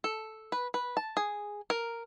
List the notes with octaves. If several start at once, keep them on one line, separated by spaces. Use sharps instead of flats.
A4
B4
B4
A5
G#4
A#4